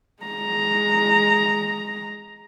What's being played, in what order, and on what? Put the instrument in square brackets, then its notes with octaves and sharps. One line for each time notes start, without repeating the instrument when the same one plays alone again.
[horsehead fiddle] G#3 A#5